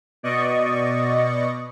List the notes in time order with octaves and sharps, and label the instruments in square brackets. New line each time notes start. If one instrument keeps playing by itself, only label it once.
[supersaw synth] B2 D5 D#5 C#6